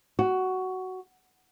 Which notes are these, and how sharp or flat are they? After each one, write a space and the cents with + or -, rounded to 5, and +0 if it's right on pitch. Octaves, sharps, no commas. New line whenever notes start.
F#4 +10